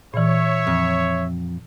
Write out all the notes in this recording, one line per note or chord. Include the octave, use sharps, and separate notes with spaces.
A#2 E3 C#5 E5
F2